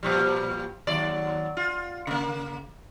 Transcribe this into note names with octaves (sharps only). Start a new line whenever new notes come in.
A#2 F3 G3
D#2 F#3 D5
F4
C#3 A#3